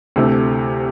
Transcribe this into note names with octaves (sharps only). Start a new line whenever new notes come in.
D2 C3 A3 E4